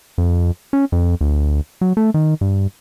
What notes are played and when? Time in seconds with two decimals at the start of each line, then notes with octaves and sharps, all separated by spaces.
0.18 F2
0.73 C#4
0.92 F2
1.21 D2
1.81 F#3
1.97 A3
2.14 D#3
2.41 G2